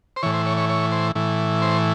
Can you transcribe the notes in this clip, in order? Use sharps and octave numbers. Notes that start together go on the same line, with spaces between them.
C5
A2 E3 C#5
C5
C#5
C#5
C#5
C5
A2 E3
C5